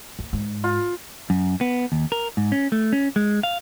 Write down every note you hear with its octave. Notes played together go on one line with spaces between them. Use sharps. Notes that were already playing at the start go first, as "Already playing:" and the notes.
D#2
G#2
F4
F#2
B3
D#2
A#4
G#2
C#4
A3
C#4
G#3
F5